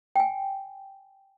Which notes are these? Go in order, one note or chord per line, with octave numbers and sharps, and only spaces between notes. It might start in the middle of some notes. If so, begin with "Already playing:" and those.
G5 G#5